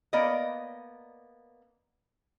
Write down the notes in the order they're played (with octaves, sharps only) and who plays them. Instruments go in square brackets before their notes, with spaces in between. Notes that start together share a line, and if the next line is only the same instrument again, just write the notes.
[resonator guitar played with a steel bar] A#3 B3 D5 D#5